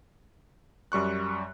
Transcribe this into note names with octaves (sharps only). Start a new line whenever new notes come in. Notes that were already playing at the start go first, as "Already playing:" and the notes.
F#2 G3 C#6 F#6